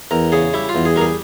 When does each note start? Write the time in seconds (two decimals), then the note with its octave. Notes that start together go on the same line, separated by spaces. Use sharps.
0.11 E2 A#4
0.32 C#3 G#4
0.54 G3 E4
0.69 F4
0.75 E2
0.85 G#4
0.96 G3 A#4
1.01 G#4